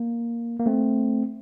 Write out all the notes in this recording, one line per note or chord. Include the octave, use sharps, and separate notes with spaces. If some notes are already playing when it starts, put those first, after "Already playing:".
Already playing: A#3
A#3
A3 C4